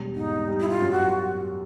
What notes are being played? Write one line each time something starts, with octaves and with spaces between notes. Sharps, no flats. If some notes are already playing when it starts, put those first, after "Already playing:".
Already playing: E1 G3
G#2 D#4
G3
E4
F4
F#2
F#4